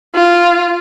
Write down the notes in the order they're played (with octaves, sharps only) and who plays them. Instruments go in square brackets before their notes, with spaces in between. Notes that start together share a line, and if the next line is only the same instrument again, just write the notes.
[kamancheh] F4